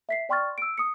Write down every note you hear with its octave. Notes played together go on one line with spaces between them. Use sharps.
E5 B6 C7
D5 G5 C6 C#6 F6 A6
E6 D7
D#6 C#7